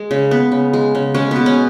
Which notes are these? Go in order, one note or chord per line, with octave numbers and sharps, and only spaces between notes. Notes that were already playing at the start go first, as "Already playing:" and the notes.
Already playing: G#3
C#3
B3
C#3
G#3
C#3
G#3 C#4
B2 B3
C#4